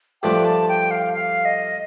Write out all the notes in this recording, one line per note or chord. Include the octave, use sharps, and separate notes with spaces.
G2 F3 A3 D4 G5
A5
G5
F5
F5
D#5